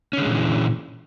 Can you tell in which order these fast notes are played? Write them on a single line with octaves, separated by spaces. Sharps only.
C#4 D3 G#3 A#2 E3